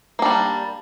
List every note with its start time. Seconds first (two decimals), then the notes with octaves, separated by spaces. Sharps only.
0.19 A#3
0.22 D4
0.25 G3